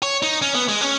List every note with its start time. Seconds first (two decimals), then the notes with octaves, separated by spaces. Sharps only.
0.03 C#5
0.23 D#4
0.42 C#4
0.55 B3
0.68 G#3
0.81 C#4